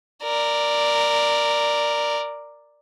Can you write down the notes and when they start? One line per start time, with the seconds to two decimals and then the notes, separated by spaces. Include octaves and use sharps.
0.23 A#4 D5